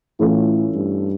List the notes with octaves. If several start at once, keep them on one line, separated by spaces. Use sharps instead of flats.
A2 E3 A3 C#4 F4 A4
G2